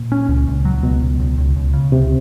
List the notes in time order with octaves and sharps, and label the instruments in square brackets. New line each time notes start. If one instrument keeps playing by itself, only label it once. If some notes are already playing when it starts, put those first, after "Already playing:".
Already playing: [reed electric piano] A#2
[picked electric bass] C#4
C#2
C#2
F#3
[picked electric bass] C#2 [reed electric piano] B2
[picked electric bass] C#2
C#2
C#2
C#2
C#3
[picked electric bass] C#2 [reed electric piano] C3